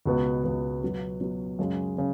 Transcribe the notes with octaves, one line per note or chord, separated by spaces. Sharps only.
C#2 B2 B3
C#2 B2 B3
B2 F#3 B3
B2 F#3 B3
F#2 C#3 G#3
C#3